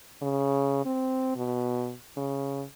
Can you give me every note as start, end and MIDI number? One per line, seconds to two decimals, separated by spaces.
0.22 0.83 49
0.85 1.32 60
1.36 1.93 47
2.17 2.63 49